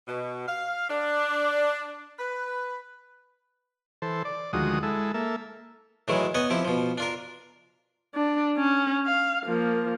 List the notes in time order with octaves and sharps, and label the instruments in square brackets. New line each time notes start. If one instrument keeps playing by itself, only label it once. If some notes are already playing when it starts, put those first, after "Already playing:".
[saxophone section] B2
F5
D4
B4
[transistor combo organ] E3 A4 C5
D5
D2 D#3 F3 G#3 F#4 D#6
G#3 E4 A4
A#3 A4 E5
[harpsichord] A2 D#3 E3 F#3 G#3 E4
B3 B4 C#5 D#5 G#5
F3 C4 E4 G4
B2 F3
D4 F4 A#4
[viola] D4
C#4
F5
F3 A#3